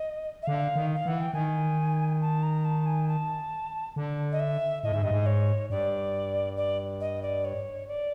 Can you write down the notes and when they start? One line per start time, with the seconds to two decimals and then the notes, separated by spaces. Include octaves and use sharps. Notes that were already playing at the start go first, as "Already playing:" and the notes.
Already playing: D#5
0.42 E5
0.47 D3 F5
0.76 D#3
0.95 F5
1.06 E3 F#5
1.21 G5
1.33 D#3 G#5
2.21 A5
2.43 A#5
2.65 A5
2.86 G#5
3.08 A5
3.96 D3
4.32 D#5
4.39 E5
4.83 A2 D#5
4.92 G#2 E5
5.02 G2 D#5
5.11 G#2
5.26 C#5
5.70 G2 D5
6.57 D5
7.01 D#5
7.22 D5
7.45 C#5
7.88 D5